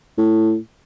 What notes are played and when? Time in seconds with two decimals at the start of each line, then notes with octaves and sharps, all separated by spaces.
0.18 A2